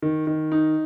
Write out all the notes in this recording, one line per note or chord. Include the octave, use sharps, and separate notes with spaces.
D#3
D#3
D#4